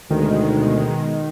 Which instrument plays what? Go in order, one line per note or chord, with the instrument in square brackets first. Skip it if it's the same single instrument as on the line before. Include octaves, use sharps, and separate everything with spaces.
[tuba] D2 [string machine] B2 G#3 [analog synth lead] D#3